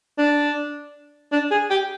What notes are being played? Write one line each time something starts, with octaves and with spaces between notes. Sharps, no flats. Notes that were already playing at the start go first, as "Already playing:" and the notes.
D4
D4
G#4
G4